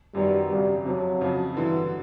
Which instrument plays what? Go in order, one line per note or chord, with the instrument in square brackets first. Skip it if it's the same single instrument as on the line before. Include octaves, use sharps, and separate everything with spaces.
[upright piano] F#2 D#3 F#3 B3 [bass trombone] G3
[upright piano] G#1 F#2 C#3 [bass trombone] G3
[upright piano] F2 C3 F3 [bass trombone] F#3
[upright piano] F2 C#3 F3
[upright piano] G2 D3 F#3 [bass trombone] E3